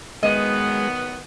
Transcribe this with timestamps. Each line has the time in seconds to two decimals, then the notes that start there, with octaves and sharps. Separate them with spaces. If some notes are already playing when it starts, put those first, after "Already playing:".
0.23 D#3 F#3 G#3 B3 D#5